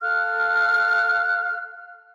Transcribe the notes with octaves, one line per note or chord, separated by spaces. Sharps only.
A4 F5 F6 F#6